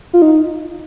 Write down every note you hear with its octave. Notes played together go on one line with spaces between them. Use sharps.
F4
D#4